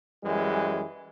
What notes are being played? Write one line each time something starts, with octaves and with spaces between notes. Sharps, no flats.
F#2 E3 G3 G#3